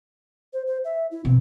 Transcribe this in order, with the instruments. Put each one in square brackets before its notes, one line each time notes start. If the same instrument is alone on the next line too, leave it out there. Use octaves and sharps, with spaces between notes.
[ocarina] C5
C5
E5
E4
[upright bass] B2 [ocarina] C4